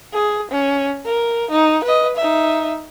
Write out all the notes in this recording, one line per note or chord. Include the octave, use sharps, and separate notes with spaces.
G#4
C#4
A#4
D#4
B4 D#5
D#4 E5